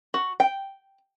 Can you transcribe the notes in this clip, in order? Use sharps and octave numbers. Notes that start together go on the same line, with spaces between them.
F#4
G5